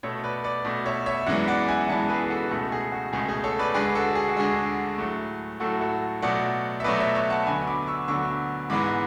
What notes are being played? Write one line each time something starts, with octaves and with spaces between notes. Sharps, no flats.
B2 A3 A4 C#5
B4 D5
B4 D5
B2 A3
C#5 E5
C#5 E5
F#2 E3 G#3 B3 D5 F#5
D5 F#5
E5 G#5
F#2 E3 G#3 B3 F#5 A5
G#4 B4
B4
F#4 A4
C#2 B2 A3 F#4 A4
G#4
F#4
C#2 B2 A3 G#4
G#4
A4 C#5
B4 D5
D2 D3 G#3 G#4 B4
F#4 A4
G#4
F#4
D2 D3 G#3 G#4
A2 F#3 A3
A2 F#3 A3 F#4 A4
F#4 A4
B2 F#3 A3 D5 F#5
E5
B2 F#3 A3 B4 D5
C#5 E5
C#5 E5
F#5 A5
D2 D3 F#3 B3 G#5 B5
B5 D6
C#6 E6
D2 D3 F#3 B3 C#6 E6
G#2 E3 G#3 B3 B5 D6